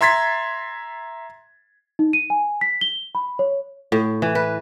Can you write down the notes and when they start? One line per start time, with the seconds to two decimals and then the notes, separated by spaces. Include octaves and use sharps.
0.01 E5 A#5 C6 G#6 A6 B6
1.99 D#4
2.13 D#7
2.30 G#5
2.61 B6
2.81 G7
3.15 B5
3.39 C#5
3.92 A2
4.22 E3
4.35 B4